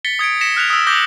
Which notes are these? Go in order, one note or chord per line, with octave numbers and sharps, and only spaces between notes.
A6 B6 C#7 G7
D#6 G#6 C#7 D7
A#6 B6 C#7 E7
F6 F#6 B6 F7
D#6 E6
D6 G6 A#6 F#7 G7